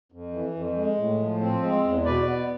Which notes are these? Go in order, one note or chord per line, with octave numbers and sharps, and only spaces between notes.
F2
E3
F2
G#3
A2
F3
C4
G#3
E2
B2 B4 D5
B3